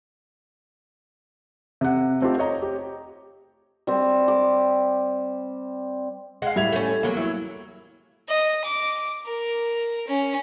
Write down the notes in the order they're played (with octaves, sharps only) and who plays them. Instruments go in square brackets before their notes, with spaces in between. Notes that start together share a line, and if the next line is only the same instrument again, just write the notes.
[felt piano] C3 F#5
A3 C4 D#4 F4 G4
C5 C#5 D#5 A#5
G4
[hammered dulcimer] G3 C4
D6
[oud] G#3 [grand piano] F5 F#5
[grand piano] A2 G#6 F7 [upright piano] G3 E5
[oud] A3 C#4
[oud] E2 F#3 [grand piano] A#3
[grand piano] E4
[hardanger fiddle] D#5
D6
A#4
C#4